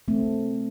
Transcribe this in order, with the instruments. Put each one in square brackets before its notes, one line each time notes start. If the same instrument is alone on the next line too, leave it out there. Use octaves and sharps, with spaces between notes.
[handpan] A3 C4